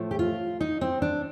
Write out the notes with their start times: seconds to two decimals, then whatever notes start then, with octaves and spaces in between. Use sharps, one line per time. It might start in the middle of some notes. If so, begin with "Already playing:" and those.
Already playing: A2 F3 A3
0.11 G4
0.19 F4
0.60 D#4
0.81 C4
1.02 D4